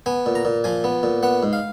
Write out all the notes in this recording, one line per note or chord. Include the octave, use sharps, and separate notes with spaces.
B3 G#5
A#2
A#5
A#2
F3 G#5
B3
A#2
B3 F#5
G#2
F5